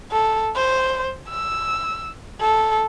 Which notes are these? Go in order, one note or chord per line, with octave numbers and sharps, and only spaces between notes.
A4
C5
E6
A4